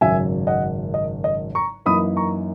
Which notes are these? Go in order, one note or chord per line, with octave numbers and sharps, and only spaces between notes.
G#1 F#2 C#3 F#3 E5 G#5
D#5 F#5
D#5
D#5
A#5 C#6
F#2 E3 A#3 D#4 B5 D#6
A#5 C#6